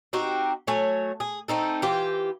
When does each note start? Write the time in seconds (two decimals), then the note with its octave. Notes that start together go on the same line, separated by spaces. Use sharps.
0.13 C4 D#4 F#4 G4
0.67 F#3 A3 C#5 G#5
1.20 G#4
1.48 A3 C4 D#4 A4
1.82 E3 F4 G4 C5